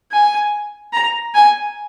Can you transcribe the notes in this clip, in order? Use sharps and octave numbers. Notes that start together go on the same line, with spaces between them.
G#5
A#5
G#5